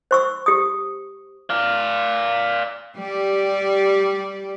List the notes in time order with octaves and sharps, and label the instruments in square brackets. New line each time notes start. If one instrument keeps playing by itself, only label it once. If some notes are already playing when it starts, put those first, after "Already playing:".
[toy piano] C5 C#6 E6
G4 D#6
[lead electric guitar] D5 F5
[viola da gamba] G3 G4 D5